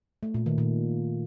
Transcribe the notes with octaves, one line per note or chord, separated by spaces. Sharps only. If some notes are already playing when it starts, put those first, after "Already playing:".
A3
A#2
D#3
A#2